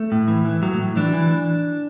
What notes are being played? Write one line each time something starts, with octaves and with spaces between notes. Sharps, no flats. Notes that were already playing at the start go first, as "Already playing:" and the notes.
Already playing: A3
A2
E3
E3
A2 F#3
A2
E3 D4
E3